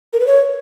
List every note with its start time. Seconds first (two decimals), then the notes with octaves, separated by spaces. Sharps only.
0.13 A#4
0.20 B4
0.27 C#5